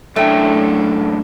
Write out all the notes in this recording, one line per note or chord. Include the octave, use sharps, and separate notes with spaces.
F#2 A2 A3 D4 G5